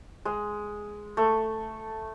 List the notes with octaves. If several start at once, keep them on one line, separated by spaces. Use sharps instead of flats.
G#3
A3